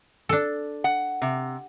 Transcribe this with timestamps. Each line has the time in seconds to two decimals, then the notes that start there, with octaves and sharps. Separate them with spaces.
0.29 D4 A4
0.84 F#5
1.22 C3